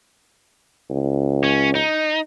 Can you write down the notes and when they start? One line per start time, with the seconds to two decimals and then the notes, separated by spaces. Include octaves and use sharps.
0.90 C#2
1.44 C#4
1.75 D#4